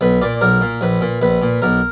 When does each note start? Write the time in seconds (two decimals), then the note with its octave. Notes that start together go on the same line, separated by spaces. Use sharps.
0.01 B1 B4
0.21 A#2 D5
0.41 B1 A#4
0.61 A#2
0.81 A#1 B4
1.01 A#2
1.21 A#1 B4
1.42 A#2
1.62 B1 A#4